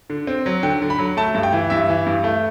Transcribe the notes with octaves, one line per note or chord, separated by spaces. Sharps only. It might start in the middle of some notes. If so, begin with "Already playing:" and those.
D3
C4
F#3
D3 G5
D3
B5
F#3
A3 A5
G2
G5
E3
G2 E5
E3
G2
A3